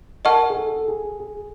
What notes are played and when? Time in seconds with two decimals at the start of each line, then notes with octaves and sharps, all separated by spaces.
0.25 A#4 D#5 F#5 A5 C#6 F6
0.50 G#4
0.57 A4
0.76 A4
0.88 G#4
1.20 G#4